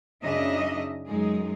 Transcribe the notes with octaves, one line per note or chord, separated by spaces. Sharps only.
F#2 C#3 D4 D#4 D#5 E5
F#2 G#3 D#4 G#4